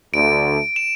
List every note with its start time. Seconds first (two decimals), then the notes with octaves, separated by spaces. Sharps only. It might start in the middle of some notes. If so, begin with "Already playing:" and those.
0.13 D2 D3 A3 D7
0.76 E7